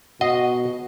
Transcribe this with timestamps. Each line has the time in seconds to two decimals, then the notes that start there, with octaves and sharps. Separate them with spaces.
0.21 B2 F#4 D#5 F#5